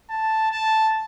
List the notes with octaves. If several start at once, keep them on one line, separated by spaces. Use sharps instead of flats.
A5
A5